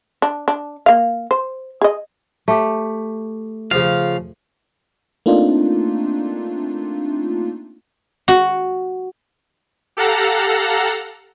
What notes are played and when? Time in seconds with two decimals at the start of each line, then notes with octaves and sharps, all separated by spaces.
0.22 D4
0.48 D4
0.86 A#3 F5
1.31 C5
1.82 G#4 D#5
2.48 A3 G4
3.71 C#3 F3 F5
5.26 A3 A#3 C4 D4 D#4 F4
8.28 F#4
9.97 G4 A4 F5 F#5 A#5